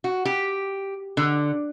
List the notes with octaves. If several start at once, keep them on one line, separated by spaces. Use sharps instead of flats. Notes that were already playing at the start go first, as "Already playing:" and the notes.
F#4
G4
D3